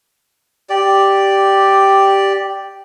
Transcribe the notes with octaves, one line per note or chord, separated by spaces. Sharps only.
G4 D5